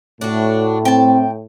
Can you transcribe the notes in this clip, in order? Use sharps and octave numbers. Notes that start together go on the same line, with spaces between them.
A2 D4 F#4
C4 G5 A5